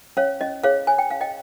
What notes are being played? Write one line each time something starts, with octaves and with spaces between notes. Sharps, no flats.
C#4 C#5 F5
C#4 D#5
G#4 C#5 F5
C#5 G#5
G5
C#4 F5
D#5 G5